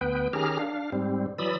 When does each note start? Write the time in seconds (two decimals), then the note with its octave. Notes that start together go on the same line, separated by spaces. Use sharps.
0.01 D2 B3 B4 G5
0.33 D#3 C#4 G4 G#4 A#5 F6
0.59 D4 F5
0.92 G#2 G3 C4
1.38 E3 F#3 D5 B5 D#6 E6